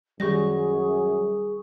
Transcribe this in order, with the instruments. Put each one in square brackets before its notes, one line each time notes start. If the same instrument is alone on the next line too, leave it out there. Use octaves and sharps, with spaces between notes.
[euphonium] F#2 [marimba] D#3 G4 A#6 [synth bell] G3 C#6 [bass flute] G#4